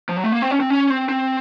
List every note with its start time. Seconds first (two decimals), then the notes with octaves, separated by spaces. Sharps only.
0.09 F3
0.16 F#3
0.24 A3
0.32 A#3
0.42 C4
0.51 C#4
0.60 C4
0.70 C#4
0.90 C4
1.09 C4